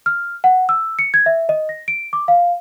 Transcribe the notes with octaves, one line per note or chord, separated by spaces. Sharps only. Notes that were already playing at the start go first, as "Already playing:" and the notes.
F6
F#5
E6
C#7
G#6
E5
D#5
A#6
D7
D6
F5